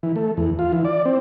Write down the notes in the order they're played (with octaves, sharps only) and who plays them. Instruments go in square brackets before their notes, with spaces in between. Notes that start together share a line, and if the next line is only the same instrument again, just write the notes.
[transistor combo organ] E3
A3
E2
F4
E3
D5
C4